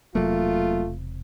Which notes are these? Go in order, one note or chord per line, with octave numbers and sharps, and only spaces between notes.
E1 C3 F#3 A3 A#3 F4